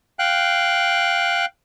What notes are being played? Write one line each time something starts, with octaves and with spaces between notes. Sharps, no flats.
F5 G5 F#6